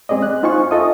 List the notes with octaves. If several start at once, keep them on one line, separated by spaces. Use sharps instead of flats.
G#3 C4 G#4 D5 D#5
F#6
D#4 F4 C5 F5 G#5 C#6
F4 A4 D#5 E5 D#6